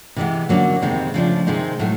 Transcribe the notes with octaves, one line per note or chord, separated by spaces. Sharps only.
C3 E3 G#3 B3
F#2 D3 F#3 A#3
F2 C3 D#3 G#3 C4
C#3 F3 A3 D4
C3 D#3 G#3 C4 D#4
A2 F#3 A3